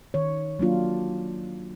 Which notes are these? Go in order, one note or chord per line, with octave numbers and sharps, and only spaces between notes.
D#3 C#5
F#3 A#3 D4 F4